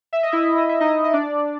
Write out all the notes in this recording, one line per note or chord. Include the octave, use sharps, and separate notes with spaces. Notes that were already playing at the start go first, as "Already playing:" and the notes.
E5
D#5
E4 E5
D#5
E5
D#4 D#5
D#5
D4 D5